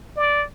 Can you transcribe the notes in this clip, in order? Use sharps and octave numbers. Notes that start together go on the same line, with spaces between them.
D5